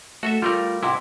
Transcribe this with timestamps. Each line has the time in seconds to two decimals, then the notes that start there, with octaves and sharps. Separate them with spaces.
0.23 A3 F#4 A4 E5
0.42 G3 A3 F4 A#4
0.83 G#2 C3 E4